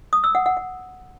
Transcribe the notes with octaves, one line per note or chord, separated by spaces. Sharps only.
D#6
E6
F#5
F#5
F#5